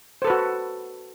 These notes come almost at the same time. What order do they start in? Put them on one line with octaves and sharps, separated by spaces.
C5 A4 B4 F#4